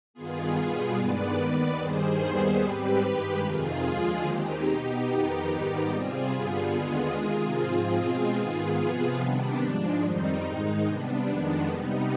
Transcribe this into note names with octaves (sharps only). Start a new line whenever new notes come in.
G2 D#3 B3 F4 G#4
B2 G3 B3
G2 D#3 G#3 B3 B4 D5
D#2 D#3 B3
G2 D#3 G3 G#4 C5
D#2 D#3 G3 B3
G#2 G3 C4 G4 B4
G2 D#3 G#3
F2 C3 D#3 F4 G#4
D#2 D3 F3 G#3
D#2 D#3 G#3 C4 D#4 G4
B2 B3
F2 D#3 B3 D#4 G4
G#2 D#3 G3 B3
C3 G3 C4 F4 G#4
G2 D3 G3 B3
D#2 D3 G#3 B3
C3 D#3 G#3
G#2 F3 C4 F4 G#4
B2 G#3 C4
G#2 D#3 B3 F4 G#4
C3 F3 B3
C3 D#3 G3 B3 D4
G#2 F3 G#3
F2 D#3 G3 C4 D#4
G#2 D#3 G#3
C3 G3 B3 D4
F2 D#3 G#3 B3
C3 G3 B3 D#4